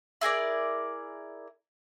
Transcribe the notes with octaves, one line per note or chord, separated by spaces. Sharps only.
E4 G#4 A#4 D5